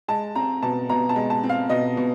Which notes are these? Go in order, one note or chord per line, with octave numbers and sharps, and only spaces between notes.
G#3 A5
C4 A#5
B2 A5
B2 A#5
A5
G#3
A5
C4
F5
B2 D#5
B2